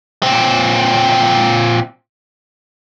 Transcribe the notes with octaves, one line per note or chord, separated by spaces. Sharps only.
A#2 C4